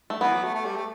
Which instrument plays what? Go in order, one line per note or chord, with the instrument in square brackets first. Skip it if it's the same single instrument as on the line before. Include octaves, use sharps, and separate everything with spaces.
[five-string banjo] A3
[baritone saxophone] E3 [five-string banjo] B3
[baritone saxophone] F#3
A3
A3
G3
A3